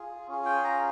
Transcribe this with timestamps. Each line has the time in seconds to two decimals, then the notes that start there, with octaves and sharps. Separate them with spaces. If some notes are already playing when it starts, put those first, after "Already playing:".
Already playing: F4 G#4
0.28 C#4 F4 G#4
0.46 G5
0.64 A#5